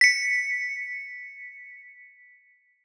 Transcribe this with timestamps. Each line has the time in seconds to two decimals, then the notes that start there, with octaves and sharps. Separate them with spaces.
0.01 B6 C#7